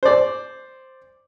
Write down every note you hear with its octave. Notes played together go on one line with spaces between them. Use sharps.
C5 D5